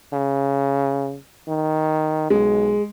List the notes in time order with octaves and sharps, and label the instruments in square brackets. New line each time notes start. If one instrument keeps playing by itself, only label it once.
[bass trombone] C#3
D#3
[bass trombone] B1 [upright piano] G#3